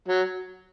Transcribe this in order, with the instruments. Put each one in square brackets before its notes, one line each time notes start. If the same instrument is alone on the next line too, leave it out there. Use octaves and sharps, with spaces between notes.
[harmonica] F#3